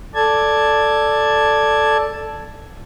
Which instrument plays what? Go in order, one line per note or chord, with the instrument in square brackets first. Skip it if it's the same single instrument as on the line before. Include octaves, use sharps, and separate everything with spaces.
[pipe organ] A4 D5 A5 G#6